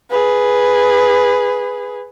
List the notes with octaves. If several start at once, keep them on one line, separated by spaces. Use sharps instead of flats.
G#4 B4